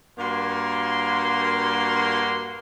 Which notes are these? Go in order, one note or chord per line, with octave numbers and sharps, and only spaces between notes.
G2 A#3 F#4 C6